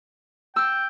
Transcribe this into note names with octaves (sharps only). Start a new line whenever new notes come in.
G5 E6